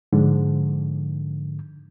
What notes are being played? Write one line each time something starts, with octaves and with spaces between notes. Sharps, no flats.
G#2 D3 F3